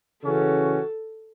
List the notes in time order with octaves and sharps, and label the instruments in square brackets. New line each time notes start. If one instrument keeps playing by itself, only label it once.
[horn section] C#3 E3 C#4 F#4 [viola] A4